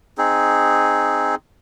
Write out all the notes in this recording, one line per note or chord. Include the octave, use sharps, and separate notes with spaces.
C4 D#4 G#4